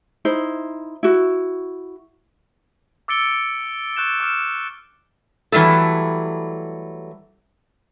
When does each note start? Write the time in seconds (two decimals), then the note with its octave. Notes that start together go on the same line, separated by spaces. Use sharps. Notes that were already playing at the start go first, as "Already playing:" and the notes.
0.25 D#4 E4 C5
1.03 E4 F#4
3.08 D6 E6 A6 C#7 D7 G7
3.96 C#6 F#6 G6 A6 E7
4.20 D6 F6 E7
5.52 E3 F#3 G3 A3 A4